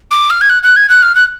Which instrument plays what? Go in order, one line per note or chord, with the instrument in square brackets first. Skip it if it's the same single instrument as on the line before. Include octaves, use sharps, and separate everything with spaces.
[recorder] D6
F6
G#6
F#6
F#6
G#6
F#6
F6
F#6